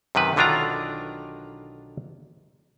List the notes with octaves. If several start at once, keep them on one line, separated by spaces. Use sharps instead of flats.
F#2 C3 D#3 B4
B1 D3 D#3 D4 F4 A#5